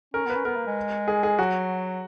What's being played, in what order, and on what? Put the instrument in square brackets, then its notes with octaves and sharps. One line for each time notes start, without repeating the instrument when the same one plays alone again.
[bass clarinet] C#4 [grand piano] A#4
[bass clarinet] B3 [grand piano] B4
[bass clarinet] C#4
[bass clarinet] B3 [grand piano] A#4
[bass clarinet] A#3
G#3
[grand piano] G#4
G#4
[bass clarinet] F#3 [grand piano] F#4